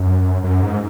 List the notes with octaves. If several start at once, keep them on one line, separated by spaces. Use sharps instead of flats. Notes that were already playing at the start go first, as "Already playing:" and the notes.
Already playing: F#2
F#2
G#2